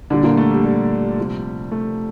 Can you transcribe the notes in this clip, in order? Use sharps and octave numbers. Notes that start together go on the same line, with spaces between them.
A#2 D3 G3 D4
A#2 A#3
A3
G3
G3
C3 F3
A3